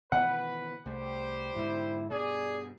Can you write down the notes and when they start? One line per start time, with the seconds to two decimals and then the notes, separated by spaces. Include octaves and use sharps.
0.12 B2 D#3 E3 B4 F#5
0.86 C2 G3 A3 G4 C5
1.56 G#2 B2 D3 E4
2.10 G2 B2 G#4 D5